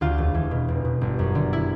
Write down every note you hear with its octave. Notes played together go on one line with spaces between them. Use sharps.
D2 F4
E1
E3
B2
F1
B2
G1
F#2
D3
E4